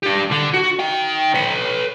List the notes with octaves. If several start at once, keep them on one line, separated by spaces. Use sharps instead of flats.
D4 G4
D3
F#4
D#3 G5
B4 C#5